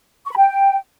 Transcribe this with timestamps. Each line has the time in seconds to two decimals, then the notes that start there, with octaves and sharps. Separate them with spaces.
0.25 C#6
0.31 B5
0.37 G5